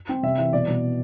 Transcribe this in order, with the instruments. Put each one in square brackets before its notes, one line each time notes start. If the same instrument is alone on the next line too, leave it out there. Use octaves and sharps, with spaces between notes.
[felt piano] C4
[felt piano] C3 [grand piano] E5
[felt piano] E3 [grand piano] E5
[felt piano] B2 [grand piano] D5
[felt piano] B2